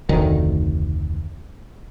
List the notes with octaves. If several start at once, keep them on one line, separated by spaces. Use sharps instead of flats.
F1 D2 D#3